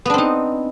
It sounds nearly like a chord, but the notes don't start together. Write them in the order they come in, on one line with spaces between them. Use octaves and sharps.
B3 D4 C4 D#4